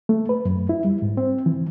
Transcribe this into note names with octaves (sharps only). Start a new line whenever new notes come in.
A3
B4
F#2
E4
G3
G#2
C4
E3